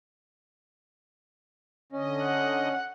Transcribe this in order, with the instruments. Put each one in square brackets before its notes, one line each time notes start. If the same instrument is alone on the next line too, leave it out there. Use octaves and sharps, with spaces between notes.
[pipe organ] D3 D#5 [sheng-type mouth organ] C#4
[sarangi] F#5